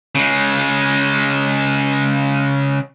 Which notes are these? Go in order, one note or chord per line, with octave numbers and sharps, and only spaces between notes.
C#3 G#3